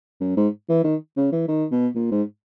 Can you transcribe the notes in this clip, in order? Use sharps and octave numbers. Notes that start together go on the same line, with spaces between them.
F#2
G#2
E3
D#3
C#3
E3
D#3
B2
A#2
G#2